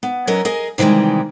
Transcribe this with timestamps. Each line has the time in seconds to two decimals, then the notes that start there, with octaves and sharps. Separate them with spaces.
0.03 B3
0.27 F#3 C#4 A#4 B4 D#5
0.45 G#4 A#4 D#5 G#5
0.78 C3 D#3 E3 G3 G#3